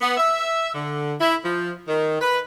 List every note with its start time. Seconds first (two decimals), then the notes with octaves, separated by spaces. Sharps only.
0.01 B3
0.17 E5
0.74 D3
1.21 E4
1.44 F3
1.88 D#3
2.21 B4